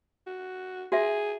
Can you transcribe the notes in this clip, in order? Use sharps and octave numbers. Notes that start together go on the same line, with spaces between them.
F#4
F#4 G#4 E5